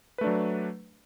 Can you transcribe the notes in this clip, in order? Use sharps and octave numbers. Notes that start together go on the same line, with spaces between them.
F#3 A3 D4 B4